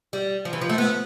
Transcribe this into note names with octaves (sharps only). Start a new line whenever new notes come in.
G3
F3
E3
F3
A3
B3